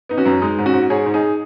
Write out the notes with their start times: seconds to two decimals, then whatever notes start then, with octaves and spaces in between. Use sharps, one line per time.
0.09 B3 D#4
0.17 C#4 F#4
0.25 F#2
0.42 G#3 D#4
0.58 G#2
0.66 C#4 F#4
0.73 G#2
0.90 G#2 G#4 C#5
1.06 G#2
1.14 D#4 G#4